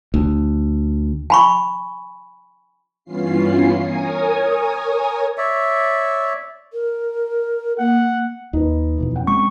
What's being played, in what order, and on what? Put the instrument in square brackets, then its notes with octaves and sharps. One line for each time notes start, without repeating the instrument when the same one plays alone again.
[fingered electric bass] D2
[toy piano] G#5 B5 C#6
[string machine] G2 E3 B3 C#4 F4 C7
A#4 C#5 G#5 D#6
[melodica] C#5 D5 E5
[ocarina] A#4
[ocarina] A#3 [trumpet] F#5
[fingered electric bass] D#2 [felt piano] D#4 B4
[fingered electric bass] F2 B2 E3
[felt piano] C#4 F#5 G5
[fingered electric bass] G#3 C4 [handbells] C#6